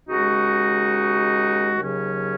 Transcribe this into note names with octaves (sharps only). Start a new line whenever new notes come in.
D#2 C#3 G#3 D#4 F#4
D#2 C#3 F#3 C#4